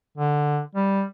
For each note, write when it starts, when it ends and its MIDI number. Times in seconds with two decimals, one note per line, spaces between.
0.17 0.60 50
0.75 1.04 55